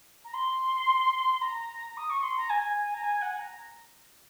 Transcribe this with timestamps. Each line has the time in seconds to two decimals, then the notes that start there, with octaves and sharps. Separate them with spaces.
0.24 A#5
0.33 C6
1.41 A#5
1.97 D#6
2.09 C#6
2.22 C6
2.36 A#5
2.49 G#5
2.94 A#5
3.03 G#5
3.21 F#5
3.38 A#5